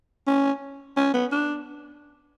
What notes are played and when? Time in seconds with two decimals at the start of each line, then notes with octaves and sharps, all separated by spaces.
0.27 C#4
0.97 C#4
1.14 B3
1.32 D4